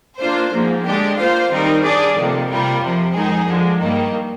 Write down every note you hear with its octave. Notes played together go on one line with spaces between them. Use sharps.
A#3 D4 F4 C5
G#2 F3 A#3
D3 G#3 D4 G4
A#3 F4 C5 F5
D#3 G3 C4 D#4 A#4
G3 D4 G#4 D5
F2 C3 D#3 A#3
C3 G3 A#3 F4 A#4
F2 C3 F3
F2 D#3 G#3 D#4 G#4
D3 F3 G#3
G2 D#3 G3 A#3